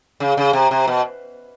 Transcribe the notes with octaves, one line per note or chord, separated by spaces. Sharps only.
C#3
C#3
C3
C3
B2